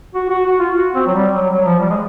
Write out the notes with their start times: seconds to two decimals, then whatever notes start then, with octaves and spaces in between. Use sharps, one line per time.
0.15 F#4
0.30 F#4
0.45 F#4
0.59 F4
0.75 F#4
0.95 C4
1.06 F#3
1.15 G3
1.35 F#3
1.50 F#3
1.65 F3
1.80 G3
1.90 G#3